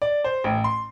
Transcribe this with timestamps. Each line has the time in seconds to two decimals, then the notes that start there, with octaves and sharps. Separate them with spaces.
0.02 D5
0.24 C5
0.44 A1
0.64 C6